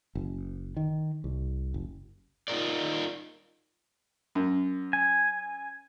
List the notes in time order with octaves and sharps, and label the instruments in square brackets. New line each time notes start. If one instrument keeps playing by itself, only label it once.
[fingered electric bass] F#1
D#3
C2
F#1
[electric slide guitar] D#4 F4 A#4 D5
[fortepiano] F#2
[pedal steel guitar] G#5